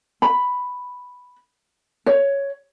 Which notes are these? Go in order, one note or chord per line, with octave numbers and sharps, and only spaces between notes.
B5
C#5